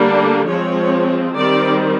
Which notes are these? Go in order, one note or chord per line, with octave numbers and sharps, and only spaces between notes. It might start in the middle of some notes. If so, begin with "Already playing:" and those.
Already playing: D3 G3 A#3 D4
F3 G#3 C4 C#5
D#3 G3 C4 D5